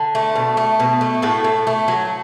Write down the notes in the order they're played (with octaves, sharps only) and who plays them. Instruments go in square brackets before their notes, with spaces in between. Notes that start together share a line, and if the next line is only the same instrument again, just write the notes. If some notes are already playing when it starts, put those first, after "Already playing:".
Already playing: [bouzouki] D3
A3
B2
A3
B2
A3
A2 F#4 A4
A2
A3
F#3